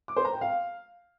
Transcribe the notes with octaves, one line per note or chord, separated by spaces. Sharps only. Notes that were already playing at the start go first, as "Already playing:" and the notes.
D6
C5
A#5
G5
F5